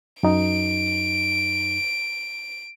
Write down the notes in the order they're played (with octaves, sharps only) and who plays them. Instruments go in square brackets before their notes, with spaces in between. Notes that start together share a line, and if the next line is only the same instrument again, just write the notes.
[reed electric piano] F#2 D#4 [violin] D7